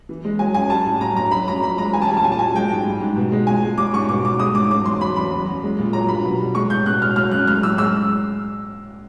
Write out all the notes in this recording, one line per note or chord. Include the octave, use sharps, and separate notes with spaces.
E3
G#3
F#3 G#5
F#2 G#5
G3 A5
A2
F#3 A#5
G2 A#5
F#3 B5
F#2 A#5
F3 B5
G#3 A#5
E3 G#5
A5
G3 G#5
A5
A#2 G#5
A5
F#3 G#5
G#3 G5
G#2
G3
G#2
B2
G#3
F3 G#5
G#3
G3 D6
G#2 C#6
B2 D6
G3 D6
G#3 D#6
G#2 D6
F#3 D6
E2 C6
F#3 B5
E2 B5
F#3
F#2
G#3
A#2
F#3 A#5
G2 B5
B2
G3
G#3 C#6
A2 G6
B2 F#6
G#3 F6
F#3 F6
F#2 F#6
G#3 F6
A2 E6
G#3 E6